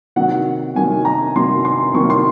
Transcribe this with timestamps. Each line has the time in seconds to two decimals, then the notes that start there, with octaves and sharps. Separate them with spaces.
0.16 C3 D#3 F#3 A#3 F#5
0.76 C3 D#3 F#3 A#3 G#5
1.05 A#5
1.35 C3 D#3 F#3 A#3 C6
1.65 C6
1.94 C3 D#3 F#3 A#3 C#6
2.10 C6